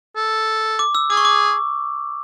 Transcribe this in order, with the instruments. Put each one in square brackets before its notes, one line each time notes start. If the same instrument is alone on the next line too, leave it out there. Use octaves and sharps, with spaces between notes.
[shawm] A4
[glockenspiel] D6
E6
[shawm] G#4 [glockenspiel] D6
[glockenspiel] C#6
D6